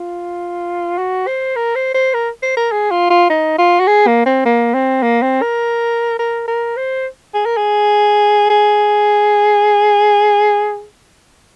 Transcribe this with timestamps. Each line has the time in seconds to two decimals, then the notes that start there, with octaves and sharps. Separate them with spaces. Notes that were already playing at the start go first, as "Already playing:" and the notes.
Already playing: F4
0.98 F#4
1.27 C5
1.56 A#4
1.75 C5
1.94 C5
2.14 A#4
2.42 C5
2.57 A#4
2.72 G#4
2.91 F4
3.10 F4
3.30 D#4
3.58 F4
3.80 F#4
3.87 G#4
4.07 A#3
4.26 C4
4.45 A#3
4.74 C4
5.03 A#3
5.22 C4
5.42 A#4
6.19 A#4
6.48 A#4
6.77 C5
7.34 G#4
7.46 A#4
7.57 G#4
8.50 G#4